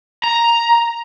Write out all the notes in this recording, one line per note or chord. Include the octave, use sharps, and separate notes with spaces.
A#5